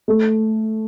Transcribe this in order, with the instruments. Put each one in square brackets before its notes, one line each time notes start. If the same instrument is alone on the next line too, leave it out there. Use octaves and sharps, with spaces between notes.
[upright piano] A3